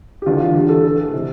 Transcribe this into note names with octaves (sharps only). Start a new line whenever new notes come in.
G4
E2 D3 F4
E2 D3 G4
A4
A2 E3 A4
C3 E3